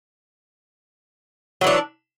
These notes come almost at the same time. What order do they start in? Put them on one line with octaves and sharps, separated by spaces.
F#3 E3 D4